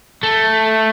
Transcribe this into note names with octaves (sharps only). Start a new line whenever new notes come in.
A3